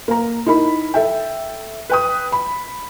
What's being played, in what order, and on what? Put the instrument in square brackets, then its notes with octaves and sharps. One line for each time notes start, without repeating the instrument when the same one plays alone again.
[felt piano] A#3 A#5
D#4 E4 A#4 B5
A4 E5 G5
B4 G5 D#6
B5